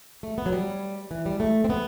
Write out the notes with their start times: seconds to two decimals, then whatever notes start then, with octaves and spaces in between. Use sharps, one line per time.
0.23 A3
0.38 B3
0.46 F#3
0.53 G3
1.11 E3
1.26 G3
1.40 A3
1.64 C4
1.70 B3